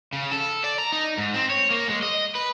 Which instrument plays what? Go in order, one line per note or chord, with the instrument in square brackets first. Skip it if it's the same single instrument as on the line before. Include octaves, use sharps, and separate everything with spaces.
[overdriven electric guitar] C#3
A4
D5
A#5
D#4
G#2
C4
C#5
A#3
G#3
D#5
B4